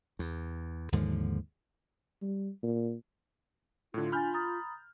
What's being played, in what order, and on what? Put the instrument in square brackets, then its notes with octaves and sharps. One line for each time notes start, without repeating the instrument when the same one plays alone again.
[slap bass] E2
D#2 G#2 D3 F3
[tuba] G3
A#2
[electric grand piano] A2 D3 [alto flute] F4
[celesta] D4 G#5 A6 [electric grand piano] B5 F6 G6
[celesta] A#5 D#6 A6